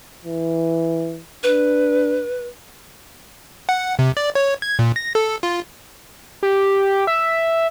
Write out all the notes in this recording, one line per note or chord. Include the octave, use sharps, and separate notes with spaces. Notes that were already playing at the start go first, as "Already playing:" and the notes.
E3
D4 B4
F#5
C3
D5
C#5
G#6
A#2
A#6
A4
F4
G4
E5